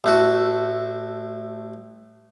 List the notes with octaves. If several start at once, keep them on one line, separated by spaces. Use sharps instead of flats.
A1 A3 F#4